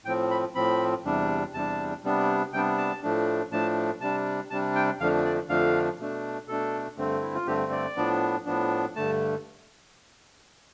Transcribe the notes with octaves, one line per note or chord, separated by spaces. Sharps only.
A2 F3 C4 G5
B5
A2 F3 C4 B5
E2 C3 G3 D4
E2 C3 G3 D4 A5
C3 G3 B3 D4
C3 G3 B3 D4 G5
A5
A2 F3 A3 D4
A2 F3 A3 D4 A5
C3 G3 D4 A5
C3 G3 D4 A5
G5
F2 D3 F3 A3 D4 F5
D5
F2 D3 F3 A3 D4 F5
B2 A3 D4
B2 A3 D4 A4
G2 D3 A3 C4
E4
F4
G2 D3 A3 C4 G4
D5
A2 F3 B3 D4
A2 F3 B3 D4
G2 D3 A3 A5